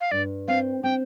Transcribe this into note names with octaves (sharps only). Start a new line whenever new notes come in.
F5
G2 D5
C4 F5
C4 G5